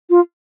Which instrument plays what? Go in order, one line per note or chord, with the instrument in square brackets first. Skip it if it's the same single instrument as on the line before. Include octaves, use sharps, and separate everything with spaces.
[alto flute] F4